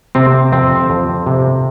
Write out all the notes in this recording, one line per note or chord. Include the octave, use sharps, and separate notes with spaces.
C3 C4
F2 C4
F2
C3